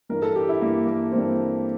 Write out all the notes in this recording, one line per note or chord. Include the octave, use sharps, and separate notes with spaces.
G2 E3 A#4
A4
G4
E4
G2 E3 A#3
A#3
G2 E3 C4